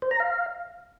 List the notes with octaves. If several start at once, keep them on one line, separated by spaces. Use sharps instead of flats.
C5
A#5
F5